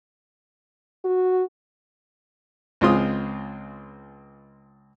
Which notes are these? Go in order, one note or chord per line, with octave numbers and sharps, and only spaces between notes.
F#4
C#2 G#3 C4 F4 C6 D#6